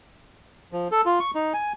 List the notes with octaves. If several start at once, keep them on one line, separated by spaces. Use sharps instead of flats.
F3
A4
F4
C#6
D#4
G#5